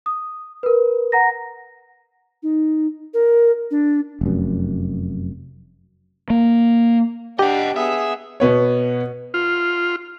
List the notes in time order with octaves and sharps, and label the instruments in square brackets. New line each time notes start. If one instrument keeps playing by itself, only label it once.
[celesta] D#6
A#4 B4
F#5 A#5 A#6
[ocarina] D#4
A#4
D4
[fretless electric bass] F1 F#2
[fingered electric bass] A#3
[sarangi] D4 [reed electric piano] G4 [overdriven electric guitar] D#5 F#5
[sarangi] B3 [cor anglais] G#4 [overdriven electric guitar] E5
[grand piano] B2 B3 C#5
[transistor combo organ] F4